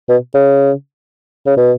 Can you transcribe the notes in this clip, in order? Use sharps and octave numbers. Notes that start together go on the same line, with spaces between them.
B2
C#3
C#3
B2